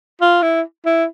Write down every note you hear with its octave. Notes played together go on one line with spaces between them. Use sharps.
F4
E4
E4